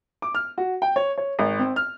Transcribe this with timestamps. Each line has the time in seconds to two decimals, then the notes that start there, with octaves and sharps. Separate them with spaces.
0.22 D6
0.35 F6
0.58 F#4
0.82 G5
0.96 C#5
1.18 C#5
1.39 G#1
1.59 C4
1.76 F6